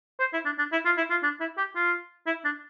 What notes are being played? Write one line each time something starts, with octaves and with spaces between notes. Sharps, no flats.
C5
E4
D4
D4
E4
F4
E4
F4
D4
E4
G4
F4
E4
D4